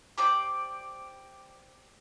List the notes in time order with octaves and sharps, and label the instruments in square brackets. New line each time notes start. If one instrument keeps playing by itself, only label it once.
[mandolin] G4 C5 D5 D6